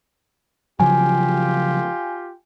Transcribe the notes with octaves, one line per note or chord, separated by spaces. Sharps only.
C#3 F3 F#3 F4 G4 G#5